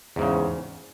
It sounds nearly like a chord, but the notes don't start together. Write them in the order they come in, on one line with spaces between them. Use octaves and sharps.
E2 G#2 C#3